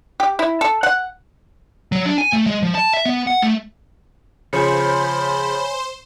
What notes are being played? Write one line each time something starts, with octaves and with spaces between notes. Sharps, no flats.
G4
E4
A4
F#5
F#3
D4
G#5
A3
G#3
F3
A5
E5
B3
F#5
A3
C#3 F3 C5 C#5 G#5 B5